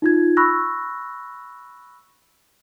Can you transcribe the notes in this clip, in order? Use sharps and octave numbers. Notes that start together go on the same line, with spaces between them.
D#4 F4 G#6
B5 C#6 E6 F#6 A#6